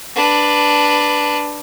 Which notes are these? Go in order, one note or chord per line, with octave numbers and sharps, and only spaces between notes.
D4 B4